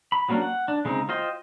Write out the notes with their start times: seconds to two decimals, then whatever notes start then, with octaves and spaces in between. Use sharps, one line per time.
0.12 B5
0.29 F#3 G3 A#3 C#4 D4
0.41 F#5
0.68 D4
0.85 C#3 G#3 C4 D#4
1.09 F4 C5 D#5 G5